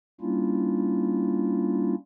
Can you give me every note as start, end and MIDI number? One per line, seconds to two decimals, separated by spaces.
0.21 1.94 55
0.21 1.94 58
0.21 1.94 61
0.21 1.94 62
0.21 1.94 64
0.21 1.94 65